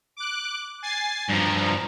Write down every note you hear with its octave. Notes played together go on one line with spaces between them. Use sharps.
D6 F#6
G#5 A6 C7
G2 F3 A#5